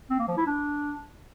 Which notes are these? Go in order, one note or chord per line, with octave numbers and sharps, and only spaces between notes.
C4
A#3
F3
E4
D4